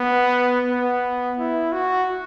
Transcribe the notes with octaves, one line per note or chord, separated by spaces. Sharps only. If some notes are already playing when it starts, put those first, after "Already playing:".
Already playing: B3
B3
E4
F#4